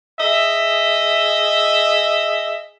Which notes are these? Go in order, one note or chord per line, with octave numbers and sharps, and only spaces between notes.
G#4 D#5 E5